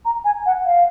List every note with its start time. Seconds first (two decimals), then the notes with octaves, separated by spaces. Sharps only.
0.05 A#5
0.25 G#5
0.46 F#5
0.66 F5